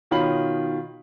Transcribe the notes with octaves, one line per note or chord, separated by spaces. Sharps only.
B2 D#3 F4 C#5 B5 F#7